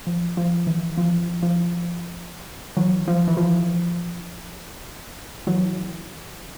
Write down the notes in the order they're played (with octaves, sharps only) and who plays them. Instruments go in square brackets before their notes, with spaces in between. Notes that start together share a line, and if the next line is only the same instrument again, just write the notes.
[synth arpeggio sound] F3
F3
E3
F3
F3
E3 F#3
F3
E3
F3
E3 F#3